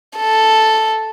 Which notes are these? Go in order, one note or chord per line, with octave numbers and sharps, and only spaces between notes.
A4